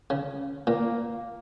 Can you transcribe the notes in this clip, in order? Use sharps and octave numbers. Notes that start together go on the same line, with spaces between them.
C#3
A#2 A#3